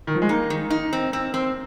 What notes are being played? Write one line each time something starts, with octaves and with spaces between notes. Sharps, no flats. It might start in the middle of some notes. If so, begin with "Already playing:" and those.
D#3
F3
G#3
A#3 D#4
D#3
D#4
C4
C4
C4